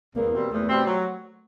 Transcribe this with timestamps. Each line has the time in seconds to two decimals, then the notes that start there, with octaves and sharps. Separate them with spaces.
0.16 E2 A#3
0.33 B2 G3 C4
0.51 E2 A3
0.69 B2 G3 C4
0.87 F#3